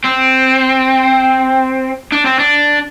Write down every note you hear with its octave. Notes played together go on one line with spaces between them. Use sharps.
C4
D4
C4
D4